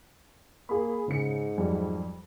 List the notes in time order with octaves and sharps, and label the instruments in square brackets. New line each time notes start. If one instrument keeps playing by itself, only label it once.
[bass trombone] A#3 [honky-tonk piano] G#4 B5
[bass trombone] G#2 [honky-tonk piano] C#3 C#7
[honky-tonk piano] F2 F#3 G3